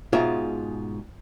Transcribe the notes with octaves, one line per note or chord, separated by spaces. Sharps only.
G#2 B2 F4 G#4 E5